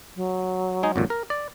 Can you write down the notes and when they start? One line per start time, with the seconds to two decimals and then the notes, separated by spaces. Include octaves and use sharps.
0.16 F#3
0.83 G#3 D#4 G#4
0.96 G#1 F2 A#2
1.10 A#4
1.30 D5